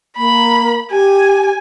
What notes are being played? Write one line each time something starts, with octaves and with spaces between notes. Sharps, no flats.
A#3 B5
G4 G#5